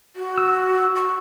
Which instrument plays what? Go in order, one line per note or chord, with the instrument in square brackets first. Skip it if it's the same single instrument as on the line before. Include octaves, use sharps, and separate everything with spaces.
[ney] F#4
[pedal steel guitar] E6
[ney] C#6